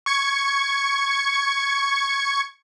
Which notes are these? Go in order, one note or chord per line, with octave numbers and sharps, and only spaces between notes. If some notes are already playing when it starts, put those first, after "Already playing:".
C#6 G#6 C#7